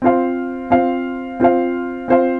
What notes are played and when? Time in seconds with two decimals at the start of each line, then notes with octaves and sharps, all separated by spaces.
0.02 C4 F4 C5 F5
0.70 C4 F4 C5 F5
1.40 C4 F4 C5 F5
2.08 C4 F4 C5 F5